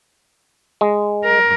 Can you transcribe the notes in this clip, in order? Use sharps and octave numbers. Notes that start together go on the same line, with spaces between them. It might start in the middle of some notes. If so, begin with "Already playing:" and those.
G#3
A#4